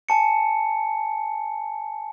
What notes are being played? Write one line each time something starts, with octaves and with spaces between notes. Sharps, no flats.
G#5 A5 C#7